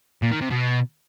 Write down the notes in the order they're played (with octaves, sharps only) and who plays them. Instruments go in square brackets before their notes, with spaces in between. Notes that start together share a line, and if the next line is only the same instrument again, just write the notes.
[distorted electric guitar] A#2
D#3
C3
B2